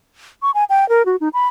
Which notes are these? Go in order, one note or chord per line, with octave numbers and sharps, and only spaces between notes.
C#6
G#5
G5
A#4
F#4
D#4
B5